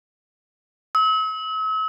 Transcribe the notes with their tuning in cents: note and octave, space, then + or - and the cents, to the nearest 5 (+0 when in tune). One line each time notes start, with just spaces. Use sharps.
E6 -45